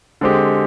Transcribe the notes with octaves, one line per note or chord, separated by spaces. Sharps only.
D3 G#3 C4 G4